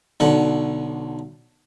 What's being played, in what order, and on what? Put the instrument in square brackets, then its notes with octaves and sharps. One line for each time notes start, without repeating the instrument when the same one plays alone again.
[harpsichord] B1 D3 F#5